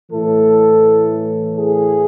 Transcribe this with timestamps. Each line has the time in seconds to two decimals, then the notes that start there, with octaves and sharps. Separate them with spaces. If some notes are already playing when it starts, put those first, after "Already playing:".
0.12 A2 E3 A3 A4
1.56 G#4